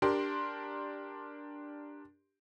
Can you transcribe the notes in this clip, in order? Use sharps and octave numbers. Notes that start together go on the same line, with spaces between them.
D4 G4 A#4 C6